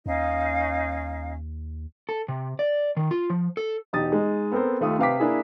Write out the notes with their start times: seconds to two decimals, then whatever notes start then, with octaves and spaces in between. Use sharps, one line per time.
0.06 D#2 C#4 D#4 F5
2.09 A4
2.28 C3
2.59 D5
2.97 D#3
3.11 F4
3.30 F3
3.57 A4
3.93 E1 D#4 G4 D#6 A6
4.12 G#3 D#4
4.52 B3 C4 A4 A#4 C5
4.81 D#2 A3 F4 D#6
4.99 C3 B4 F5 G5 D6 B6
5.20 A#3 D4 E4 G#4